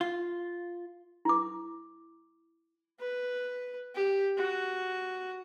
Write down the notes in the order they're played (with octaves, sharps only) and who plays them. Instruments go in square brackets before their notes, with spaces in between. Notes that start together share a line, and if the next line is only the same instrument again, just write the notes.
[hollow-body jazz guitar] F4
[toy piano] E4 D6
[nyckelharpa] B4
G4
F#4